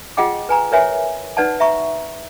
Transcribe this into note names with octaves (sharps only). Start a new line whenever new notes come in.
F4 G#4 D#5 F#5 G5 D6
B4 G#5 A#5
A#4 B4 C#5 E5 G#5
D#4 B4 D5 F#5 A5
E5 A#5 C#6